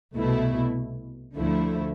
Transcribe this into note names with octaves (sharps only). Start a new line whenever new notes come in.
C2 B2 A3 E4
D2 D3 F3 A3 E4